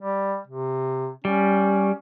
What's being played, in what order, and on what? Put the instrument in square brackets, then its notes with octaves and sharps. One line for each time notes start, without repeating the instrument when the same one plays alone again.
[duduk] G3
C3
[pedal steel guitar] G3 [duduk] C#4